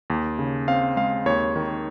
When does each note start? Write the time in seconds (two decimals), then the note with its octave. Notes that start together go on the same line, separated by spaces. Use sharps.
0.10 D#2
0.39 C#3
0.68 C4 F5
0.96 G#3 F5
1.26 D#2 C#5
1.56 D#3